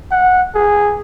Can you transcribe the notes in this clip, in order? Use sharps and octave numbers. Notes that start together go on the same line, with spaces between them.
F#5
G#4